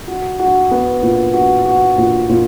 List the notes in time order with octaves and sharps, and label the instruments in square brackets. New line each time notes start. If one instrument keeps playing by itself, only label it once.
[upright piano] F#4
F#4
B3
A#2
F#4
F#4
A#2
A#2